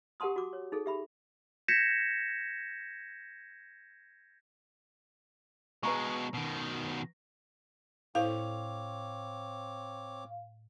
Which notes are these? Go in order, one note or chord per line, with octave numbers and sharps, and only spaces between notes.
G4 A#4 F#5 A5 C6 D#6
F#4 D6
C#5
D#4 G#4 A4
G4 E5 B5
G6 G#6 A#6 B6 C#7 E7
B2 G#3 B4 A#5 C#6
B2 D#3
A2 C4 E4 A4 C5 C#5 F5 D6